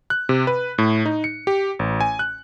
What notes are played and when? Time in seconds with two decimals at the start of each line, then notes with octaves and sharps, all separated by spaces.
0.10 F#6
0.29 C3
0.47 B4
0.78 A2
1.06 D#4
1.24 C#7
1.47 G4
1.79 A1
2.01 G#5
2.19 F#6